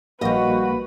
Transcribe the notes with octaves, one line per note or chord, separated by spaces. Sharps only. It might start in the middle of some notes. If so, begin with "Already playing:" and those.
A#1 G3 A#3 F#4 B4 D#5